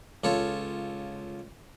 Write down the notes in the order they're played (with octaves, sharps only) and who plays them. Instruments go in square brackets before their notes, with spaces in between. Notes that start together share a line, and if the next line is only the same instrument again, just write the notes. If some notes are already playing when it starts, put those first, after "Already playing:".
[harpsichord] C#2 F4 A4 C#5